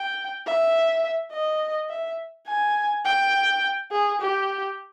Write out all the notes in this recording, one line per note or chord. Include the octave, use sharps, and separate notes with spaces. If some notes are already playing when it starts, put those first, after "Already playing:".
Already playing: G5
E5
D#5
E5
G#5
G5
G#4
G4